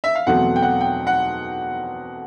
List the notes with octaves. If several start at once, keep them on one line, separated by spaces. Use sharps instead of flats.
E5
F5
E2 B2 F#3 A3 C4 F#5
G5
F#5
G5
F#5